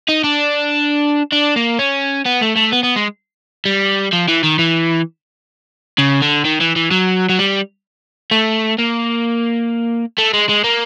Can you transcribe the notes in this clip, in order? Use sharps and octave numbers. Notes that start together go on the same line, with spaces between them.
D#4
D4
D4
A#3
C#4
B3
A3
A3
B3
B3
G#3
G3
F3
E3
D#3
E3
C#3
D3
D#3
E3
E3
F#3
F#3
G3
A3
A#3
A3
G#3
G#3
A#3